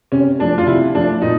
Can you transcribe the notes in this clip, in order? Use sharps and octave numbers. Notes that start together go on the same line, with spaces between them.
C3 C#4
F3 A3 D4
F4
C3 E4
F3 A3 D4
A#2 D#4